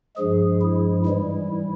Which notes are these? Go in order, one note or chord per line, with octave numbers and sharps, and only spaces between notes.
G2 F3 G#3 G#4
E4
G#2 E3 G3 E4